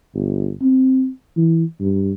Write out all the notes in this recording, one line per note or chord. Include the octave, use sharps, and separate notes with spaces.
G1
C4
E3
G2